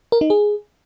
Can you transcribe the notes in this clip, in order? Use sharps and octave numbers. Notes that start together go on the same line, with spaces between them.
A#4
D#4
G#4